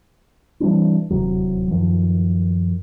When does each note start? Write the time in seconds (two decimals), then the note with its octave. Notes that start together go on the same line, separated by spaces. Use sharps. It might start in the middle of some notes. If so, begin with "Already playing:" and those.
0.60 E3 G3 C4 D4
1.10 D1 D#2 C3 F#3
1.71 F#2 D#3 F3